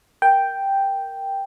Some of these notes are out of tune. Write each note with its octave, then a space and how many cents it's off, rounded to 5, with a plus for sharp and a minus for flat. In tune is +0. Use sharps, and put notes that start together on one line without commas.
A#4 +0 G5 +0